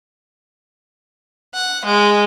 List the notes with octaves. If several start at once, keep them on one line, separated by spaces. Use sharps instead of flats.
F#5
G#3